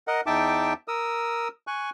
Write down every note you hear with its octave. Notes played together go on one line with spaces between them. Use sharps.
A#4 D#5 F#5
E2 D#4 E5 G5 A5 D6
A#4 D#6 E6
G#5 C#6 F#6